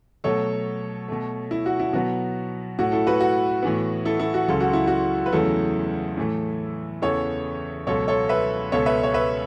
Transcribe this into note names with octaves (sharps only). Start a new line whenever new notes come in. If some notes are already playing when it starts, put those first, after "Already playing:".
B2 F#3 A3 A4 C#5
B2 A3
E4
F#4
E4
B2 F#3 B3 F#4
A2 A3 F#4
E4 A4
F#4 B4
F#4
A2 E3 B3
E4 A4
E4 A4
F#4
C#2 C#3 F#3 A4
F#4
E4
F#4
B4
E2 C#3 F#3 A3 E4 A4
A2 E3 A3
E2 C#3 E3 B3 A4 C#5
C#2 B2 F#3 A4 C#5
A4 C#5
B4 E5
C#2 B2 B3 A4 C#5
B4 E5
C#5
B4 E5